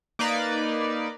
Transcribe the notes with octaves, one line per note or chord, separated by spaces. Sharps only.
A#3 D#4 B4 D5